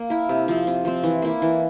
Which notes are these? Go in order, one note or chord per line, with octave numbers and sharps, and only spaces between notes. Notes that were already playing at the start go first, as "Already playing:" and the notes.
Already playing: A#3
E4 A#4
C3
F3 C4
C3
F3 C4
E3
A#3 E4
E3